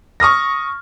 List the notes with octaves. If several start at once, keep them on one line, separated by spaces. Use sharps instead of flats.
C#6 D#6 F6 A#6